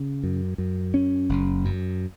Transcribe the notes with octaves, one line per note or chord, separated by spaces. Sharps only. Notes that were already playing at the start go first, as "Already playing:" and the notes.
Already playing: C#3
F#2
F#2
C#4
F#1
F#2